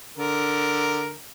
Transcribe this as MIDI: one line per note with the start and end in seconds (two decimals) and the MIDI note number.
0.18 1.15 50
0.18 1.15 70